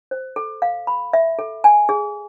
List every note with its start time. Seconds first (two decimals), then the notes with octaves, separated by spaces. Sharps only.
0.11 C5
0.36 A4
0.62 F5
0.87 B5
1.13 E5
1.39 A4
1.64 G#5
1.89 G#4